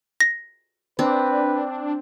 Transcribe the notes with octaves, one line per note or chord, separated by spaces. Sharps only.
A#6
C4 D4 B4